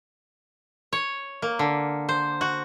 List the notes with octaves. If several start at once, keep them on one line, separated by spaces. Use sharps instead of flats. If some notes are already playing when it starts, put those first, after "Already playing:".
C#5
A#3
D3
C5
F#4